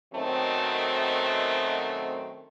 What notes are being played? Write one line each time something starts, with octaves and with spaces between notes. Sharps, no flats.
F#2 B2 D#3 A3 C4